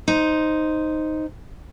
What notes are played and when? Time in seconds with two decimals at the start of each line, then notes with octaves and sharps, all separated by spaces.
0.08 D#4 C5